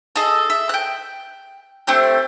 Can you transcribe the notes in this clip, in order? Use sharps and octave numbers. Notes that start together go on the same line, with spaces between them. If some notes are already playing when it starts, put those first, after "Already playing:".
G#4 A4 D#5
E5
G5 F#6
A3 C4 D4 G4